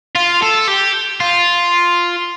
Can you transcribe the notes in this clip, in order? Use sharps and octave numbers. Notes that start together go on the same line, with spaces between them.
F4
A4
G4
F4